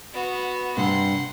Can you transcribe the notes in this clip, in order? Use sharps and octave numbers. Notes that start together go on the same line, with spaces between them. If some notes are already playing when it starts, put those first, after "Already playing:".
B3 F#4
G2 C3 F#5 C6